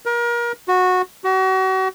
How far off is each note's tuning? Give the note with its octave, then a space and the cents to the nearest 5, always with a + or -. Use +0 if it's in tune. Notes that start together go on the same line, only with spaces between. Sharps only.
A#4 +30
F#4 -15
F#4 +35